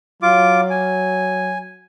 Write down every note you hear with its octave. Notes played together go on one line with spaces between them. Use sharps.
F#3 F4 D6
G#5